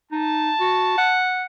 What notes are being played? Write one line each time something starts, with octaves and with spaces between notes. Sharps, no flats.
D#4 A5
F#4
F#5